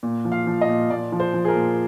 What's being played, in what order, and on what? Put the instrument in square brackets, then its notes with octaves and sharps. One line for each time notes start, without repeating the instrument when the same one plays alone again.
[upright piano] A#2
F3
F5
F3
D#5
A#2
A#2 D5
F3
C5
F3
G#4
A#4
A#2